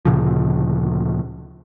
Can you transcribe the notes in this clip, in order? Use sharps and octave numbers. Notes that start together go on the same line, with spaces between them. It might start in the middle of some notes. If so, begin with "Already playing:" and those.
D2 A#2 C#3 F3